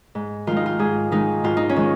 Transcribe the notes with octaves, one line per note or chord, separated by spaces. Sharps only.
G#2
D#3 G#3 F4
D#4
F4
G#2 G#4
D#3 G#3 D#4
G#2 F4
D#4
C#4
D#3 G#3